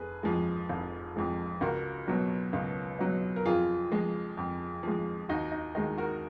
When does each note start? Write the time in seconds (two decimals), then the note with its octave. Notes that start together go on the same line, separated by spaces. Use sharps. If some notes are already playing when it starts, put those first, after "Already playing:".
Already playing: F1 G#4 B4
0.23 F2 F3 G#3
0.69 F1
1.16 F2 F3 G#3
1.61 C#2 F#4 A#4
2.08 B2 F#3
2.53 C#2
2.99 B2 F#3
3.36 A#4
3.45 F2 F4 G#4
3.91 F3 G#3
4.37 F2
4.83 F3 G#3
5.29 D#2 D#4 F#4
5.52 D#4
5.75 D#3 G#3 D#4 F#4
5.98 F#4 A#4